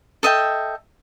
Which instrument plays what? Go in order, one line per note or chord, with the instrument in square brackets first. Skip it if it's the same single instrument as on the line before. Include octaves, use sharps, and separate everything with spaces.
[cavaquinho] A4 D#5 E5 G5